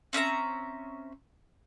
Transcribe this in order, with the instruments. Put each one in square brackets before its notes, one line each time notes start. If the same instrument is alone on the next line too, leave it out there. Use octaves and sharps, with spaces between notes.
[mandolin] C4 C#4 E5 A#5